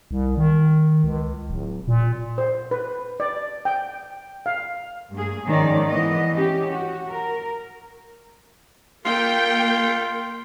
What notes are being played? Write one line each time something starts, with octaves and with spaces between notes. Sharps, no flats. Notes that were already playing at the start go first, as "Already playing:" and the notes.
C2
D#3
C#2
D1
A#2
C5
B4
D5
G5
F5
G2 A3 A#3 G#4
G#2 D#3 F3 C#4 D5
E3 G#3 B3 D#5
C#4 G4
F#4
A#4
A#3 F4 G5